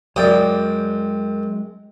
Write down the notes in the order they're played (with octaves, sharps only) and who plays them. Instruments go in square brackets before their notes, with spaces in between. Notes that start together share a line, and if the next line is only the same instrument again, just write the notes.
[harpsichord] F#2 D#6 [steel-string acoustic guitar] G#3 G5 [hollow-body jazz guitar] C#5 D5